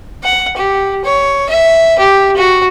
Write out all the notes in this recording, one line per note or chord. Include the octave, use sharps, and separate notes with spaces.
F#5
G4
C#5
E5
G4
F#4